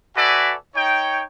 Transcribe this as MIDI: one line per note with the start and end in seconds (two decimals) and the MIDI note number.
0.17 0.55 66
0.17 0.55 69
0.17 0.55 71
0.17 0.55 74
0.17 0.55 76
0.17 0.55 80
0.76 1.23 63
0.76 1.23 73
0.76 1.23 79